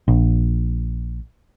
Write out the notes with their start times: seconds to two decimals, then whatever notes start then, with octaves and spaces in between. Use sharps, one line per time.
0.08 A#1